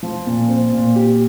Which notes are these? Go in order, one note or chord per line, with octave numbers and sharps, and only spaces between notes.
F3
A#2
C4
A#2
G4